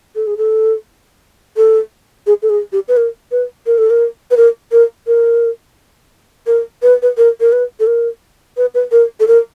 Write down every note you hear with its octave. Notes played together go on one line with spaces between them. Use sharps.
A4
G#4
A4
A4
G#4
A4
G#4
G4
B4
A#4
B4
A#4
A4
A#4
B4
A#4
A#4
A#4
A#4
B4
B4
A#4
A#4
B4
A4
A#4
B4
B4
A#4
A4
A#4